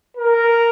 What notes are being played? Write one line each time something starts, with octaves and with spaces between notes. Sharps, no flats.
A#4